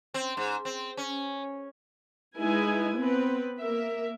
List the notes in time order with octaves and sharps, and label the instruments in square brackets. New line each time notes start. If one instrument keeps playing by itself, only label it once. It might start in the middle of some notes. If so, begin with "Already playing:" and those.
[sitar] C4
G#2
C4
C#4
[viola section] G#3 D#4 E4 B4 G#5
B3 C4 B4
A#3 A#4 E5